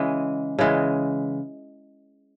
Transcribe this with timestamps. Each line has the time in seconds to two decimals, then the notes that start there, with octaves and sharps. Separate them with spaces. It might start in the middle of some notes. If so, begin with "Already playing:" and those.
Already playing: C#3 E3 G#3
0.59 C#3 E3 G#3